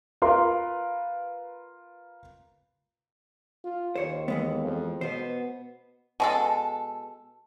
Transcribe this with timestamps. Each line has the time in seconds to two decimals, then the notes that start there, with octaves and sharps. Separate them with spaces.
0.22 F4 A#4 B4 C6
3.64 F4
3.96 D#2 C5 C#5
4.28 E3 G#3 B3
4.64 F2
5.01 B2 B3 C5
6.20 B2 G#3 A4